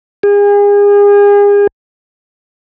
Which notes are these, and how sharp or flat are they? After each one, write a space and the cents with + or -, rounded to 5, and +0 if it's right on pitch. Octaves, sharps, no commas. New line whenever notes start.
G#4 -35